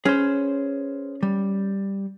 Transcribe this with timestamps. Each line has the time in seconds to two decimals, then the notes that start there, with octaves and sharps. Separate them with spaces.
0.05 C#4 G#4 B4 C5
1.23 G3